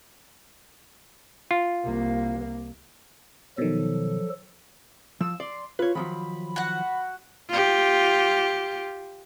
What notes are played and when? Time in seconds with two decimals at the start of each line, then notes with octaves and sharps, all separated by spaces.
1.51 F4
1.84 C2 A#3
3.58 B2 D#3 F3 F#3 A4
5.21 F3 E6
5.40 D5 C6
5.79 F4 B4 C#5
5.95 D#3 F3 F#3 B5
6.56 F#4 F#5
7.50 F4 G4